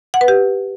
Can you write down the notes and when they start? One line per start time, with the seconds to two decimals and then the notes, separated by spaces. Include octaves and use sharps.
0.14 F#5
0.21 B4
0.28 G4